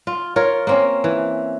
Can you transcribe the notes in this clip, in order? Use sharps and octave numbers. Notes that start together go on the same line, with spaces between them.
F4
F4 A#4 C#5
A#3 C4 C#4
E3